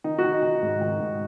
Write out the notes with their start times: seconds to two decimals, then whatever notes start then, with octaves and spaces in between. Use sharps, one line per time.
0.04 D#3 D#4
0.18 F#4
0.24 D#3
0.33 D#4
0.43 D#3
0.63 G#2
0.81 D#3
1.01 G#2